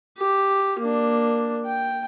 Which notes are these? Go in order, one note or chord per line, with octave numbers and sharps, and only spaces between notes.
G4
A#3 D4
G5